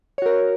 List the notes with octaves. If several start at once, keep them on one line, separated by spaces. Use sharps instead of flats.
F#4 A#4 C#5